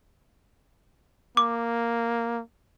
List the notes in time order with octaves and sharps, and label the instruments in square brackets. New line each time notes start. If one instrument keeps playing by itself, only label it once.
[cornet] A#3 [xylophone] D6